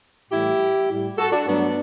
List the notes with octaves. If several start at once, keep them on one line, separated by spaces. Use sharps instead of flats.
A2 E3 G3 E4 G4
A2 G3
F#4 A4
D4 F#4
G2 F#3 A3 B3 D4